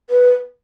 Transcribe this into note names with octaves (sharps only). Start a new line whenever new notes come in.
B4